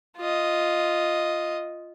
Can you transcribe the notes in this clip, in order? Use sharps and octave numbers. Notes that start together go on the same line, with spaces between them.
F4 D#5